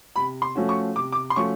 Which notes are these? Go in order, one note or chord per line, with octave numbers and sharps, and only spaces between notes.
C3 B5
C6
F3 A3 C#4 F#4
C#6
C3 D6
D6
C6
F3 A3 C#4 F#4 C#6